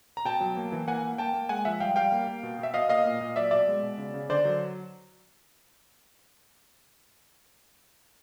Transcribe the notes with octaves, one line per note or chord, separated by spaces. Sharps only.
A#5
B2 G5 A5
F#3
A#3
E3
A#3 F#5 G#5
A#3
A#3 G5 A5
A#3
G#3 F#5 G#5
F3 E5 F#5
G3 F5 G5
G3 F5 G5
A#3
A#3
B2
B2 E5
B2 D#5 F5
A#3 D#5 F5
A#2
A#2
F#3 D5 E5
B2 D5 E5
G#3
B2
C#3
C#3
D3 C5 D5
F#3